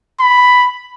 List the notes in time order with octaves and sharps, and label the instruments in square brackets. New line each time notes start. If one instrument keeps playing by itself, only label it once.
[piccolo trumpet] B5